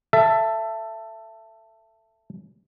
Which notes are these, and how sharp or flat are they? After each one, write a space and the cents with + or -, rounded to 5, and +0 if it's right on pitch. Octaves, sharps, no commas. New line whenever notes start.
A4 +10 E5 +20